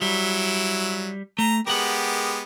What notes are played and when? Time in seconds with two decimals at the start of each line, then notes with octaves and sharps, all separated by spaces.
0.02 F#3 G3 E4
1.39 A3 A#5
1.67 G#3 B3 G4 A#4 F#5